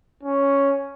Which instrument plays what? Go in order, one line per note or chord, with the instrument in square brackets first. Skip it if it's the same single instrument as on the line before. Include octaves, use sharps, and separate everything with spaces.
[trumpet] C#4